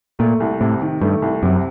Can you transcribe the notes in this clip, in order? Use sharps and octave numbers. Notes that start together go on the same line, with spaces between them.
A#2 A3
C2
A2 C3
D#3
G2 A3
C2
F#2 C3